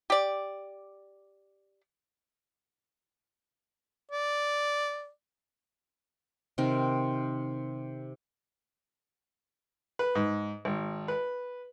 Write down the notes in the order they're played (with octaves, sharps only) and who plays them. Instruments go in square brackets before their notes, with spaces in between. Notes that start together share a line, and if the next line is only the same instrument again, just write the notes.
[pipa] G4 D5
[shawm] D5
[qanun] C3 D#3 C4 A#4
[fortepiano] B4
G#2
G#1
B4